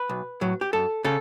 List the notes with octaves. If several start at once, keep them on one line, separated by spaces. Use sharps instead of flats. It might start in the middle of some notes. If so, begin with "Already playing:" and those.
Already playing: B4
B1
A2 F#3
G4
F#2 A4
C#3 A4